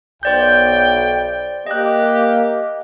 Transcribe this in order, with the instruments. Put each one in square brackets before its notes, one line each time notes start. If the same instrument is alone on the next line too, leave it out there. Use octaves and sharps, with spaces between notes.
[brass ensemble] B1 G5 [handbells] C5 D5 G6
[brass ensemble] A#3 G4 [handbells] D#5 F#6